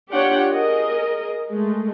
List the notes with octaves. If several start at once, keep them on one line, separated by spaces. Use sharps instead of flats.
D4 F4 G4 C#5 F#5 G5
G#4 A#4 D#5
G#3 A3